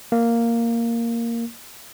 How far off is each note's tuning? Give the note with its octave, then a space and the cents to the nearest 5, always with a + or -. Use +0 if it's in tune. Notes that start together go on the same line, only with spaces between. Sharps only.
A#3 -5